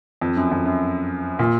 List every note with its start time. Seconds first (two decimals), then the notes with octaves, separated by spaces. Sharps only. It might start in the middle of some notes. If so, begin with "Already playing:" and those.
0.21 F2
0.37 F#2
0.51 F2
0.65 F#2
1.39 A#2